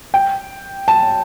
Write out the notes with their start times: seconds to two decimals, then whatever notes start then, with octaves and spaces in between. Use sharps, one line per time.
0.14 G5
0.88 A5